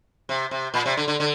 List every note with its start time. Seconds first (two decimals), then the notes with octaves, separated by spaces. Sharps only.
0.29 C3
0.51 C3
0.74 A#2
0.86 C3
0.97 D3
1.08 D3
1.20 D3